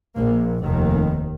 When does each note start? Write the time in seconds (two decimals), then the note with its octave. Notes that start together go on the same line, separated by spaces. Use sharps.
0.14 A#1 A#2 A#3
0.63 F1 D#2 D#3